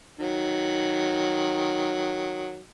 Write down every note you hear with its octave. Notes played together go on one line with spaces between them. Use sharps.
D#3 F#3